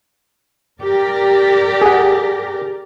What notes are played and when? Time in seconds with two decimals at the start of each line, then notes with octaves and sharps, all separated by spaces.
0.80 G4 A#4 D5
1.82 G#4 F#5